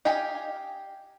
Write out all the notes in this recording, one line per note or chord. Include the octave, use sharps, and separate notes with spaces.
G4 D#5 F5 G5 G#5